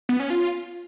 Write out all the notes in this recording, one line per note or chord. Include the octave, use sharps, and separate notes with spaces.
B3
C#4
F4